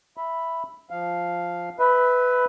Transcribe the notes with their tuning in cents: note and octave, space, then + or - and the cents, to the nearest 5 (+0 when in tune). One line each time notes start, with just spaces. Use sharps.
E5 +0 B5 +0
F3 +0 F5 +0
B4 +10 E5 -20 B5 +10